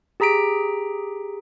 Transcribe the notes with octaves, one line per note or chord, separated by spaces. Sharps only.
G4 G#4 A#5 B6 D7